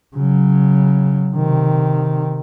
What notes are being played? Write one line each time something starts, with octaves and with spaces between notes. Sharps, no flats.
C#3 F#3
C3 D#3